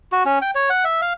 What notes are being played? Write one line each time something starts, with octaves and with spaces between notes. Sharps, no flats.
F#4
C#4
G5
C#5
F#5
E5
F5